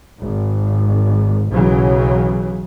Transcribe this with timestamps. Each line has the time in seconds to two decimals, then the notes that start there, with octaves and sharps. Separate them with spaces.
0.21 G#1
1.50 B1 C#3 E3 F#3